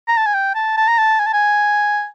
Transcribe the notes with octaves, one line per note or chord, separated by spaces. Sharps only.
A#5
A5
G#5
G5
A5
A5
A#5
A5
G#5
A5
G#5